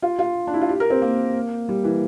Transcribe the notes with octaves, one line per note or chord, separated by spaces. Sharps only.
F4
F4
D4
E4
F4
G4
A#4
C4
A#3
G3
E3